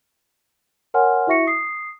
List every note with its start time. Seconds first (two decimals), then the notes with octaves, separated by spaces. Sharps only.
0.94 A#4 C#5 F#5 G#5 C6 F6
1.27 E4 F#4 E5 C#6 A#6 C#7
1.47 D#6 C7